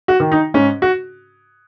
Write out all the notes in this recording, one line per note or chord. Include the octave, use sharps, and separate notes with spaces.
F#4
D#3
D#4
G#2 C#4
F#4